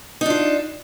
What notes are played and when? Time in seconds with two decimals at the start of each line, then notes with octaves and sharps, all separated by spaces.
0.21 D#4
0.26 D4
0.30 F4